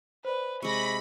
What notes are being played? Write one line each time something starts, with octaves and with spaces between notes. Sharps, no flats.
B4 C5 D5
C3 G#3 B5 C#6 A#6